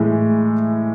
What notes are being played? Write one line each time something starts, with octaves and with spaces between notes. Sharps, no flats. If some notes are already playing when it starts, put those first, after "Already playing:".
Already playing: A2 E3 G#3